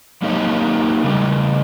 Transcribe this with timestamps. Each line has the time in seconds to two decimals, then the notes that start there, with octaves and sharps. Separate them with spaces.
0.22 F#3 A#3 D#4 G4 C#5 D#5
1.04 C#3 G3 C#4